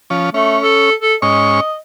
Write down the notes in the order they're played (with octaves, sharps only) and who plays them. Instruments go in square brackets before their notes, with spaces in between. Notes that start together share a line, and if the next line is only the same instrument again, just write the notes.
[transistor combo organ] F3 C#4
[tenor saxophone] A3 [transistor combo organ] C#4
[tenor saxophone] A4
A4
[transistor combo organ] G#2 C#4 C#6 [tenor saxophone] D#5